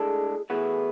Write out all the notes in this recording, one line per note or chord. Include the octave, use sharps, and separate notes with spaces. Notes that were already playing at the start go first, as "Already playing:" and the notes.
Already playing: A2 G#3 D4 G#4 A4
A2 E3 B3 F#4 G#4